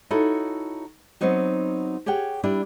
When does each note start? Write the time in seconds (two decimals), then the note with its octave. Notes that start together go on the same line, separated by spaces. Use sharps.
0.11 D#4 E4 F#4 A4 C#5
1.21 F#3 B3 C4 D#4 F#4
2.06 G4 G#4 C#5 F#5 G5
2.44 G3 D4 E4 B4